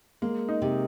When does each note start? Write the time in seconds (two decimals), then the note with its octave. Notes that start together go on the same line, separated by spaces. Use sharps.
0.22 G#3 A#3
0.49 D#4
0.62 C3